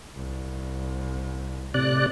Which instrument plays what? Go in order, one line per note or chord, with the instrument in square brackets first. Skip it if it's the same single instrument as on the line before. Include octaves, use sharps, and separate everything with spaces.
[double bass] C2
[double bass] A2 [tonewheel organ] C3 D5 F#6